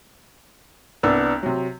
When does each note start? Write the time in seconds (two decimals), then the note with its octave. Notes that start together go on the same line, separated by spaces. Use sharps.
1.03 C2 B3 D4 E6
1.43 C3 F#3